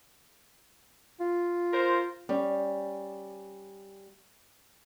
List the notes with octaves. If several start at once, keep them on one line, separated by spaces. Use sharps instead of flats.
F4
A#4 C5
G3 C#4